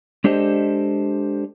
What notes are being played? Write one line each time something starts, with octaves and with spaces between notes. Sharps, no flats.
G#3 D4 G4 A4 C5 D#5